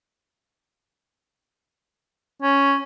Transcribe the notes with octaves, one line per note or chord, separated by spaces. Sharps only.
C#4